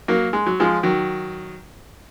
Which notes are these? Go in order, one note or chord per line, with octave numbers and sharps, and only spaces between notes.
F#3 A#3
G#3
F#3
F3 G#3
D#3 F#3